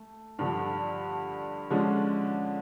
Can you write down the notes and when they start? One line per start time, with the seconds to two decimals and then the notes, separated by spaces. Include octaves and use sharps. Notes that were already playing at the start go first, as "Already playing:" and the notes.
Already playing: A3
0.39 G2 D3 F3
1.70 D3 F3 G#3 C#4